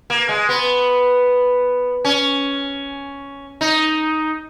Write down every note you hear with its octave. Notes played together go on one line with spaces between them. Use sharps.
A#3
G#3
B3
C#4
D#4